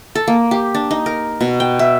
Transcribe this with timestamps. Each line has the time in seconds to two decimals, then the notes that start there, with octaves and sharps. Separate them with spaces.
0.15 A4
0.27 A#3
0.51 G4
0.74 D4
0.91 D#4
1.06 A#4
1.41 B2
1.60 G5
1.79 E5